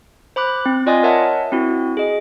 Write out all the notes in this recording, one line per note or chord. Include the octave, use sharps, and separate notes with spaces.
C5 B5 D6 F#6
C4
F4 D5 D#5 G#5 C6 D#6
A#4 C#5 D#5 E5 F#5 A5
C4 E4 F#4
G#4 D#5